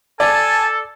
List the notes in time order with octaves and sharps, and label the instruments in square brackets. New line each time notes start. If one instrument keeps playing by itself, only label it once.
[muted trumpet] A4 [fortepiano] D5 [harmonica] G#5 [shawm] A5